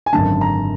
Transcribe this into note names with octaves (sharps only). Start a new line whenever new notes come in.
G#5
G#1 F#2 D3 A5
A#5